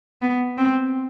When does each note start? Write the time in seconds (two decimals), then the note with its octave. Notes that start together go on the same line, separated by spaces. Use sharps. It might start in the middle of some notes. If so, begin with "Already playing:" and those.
0.22 B3
0.58 C4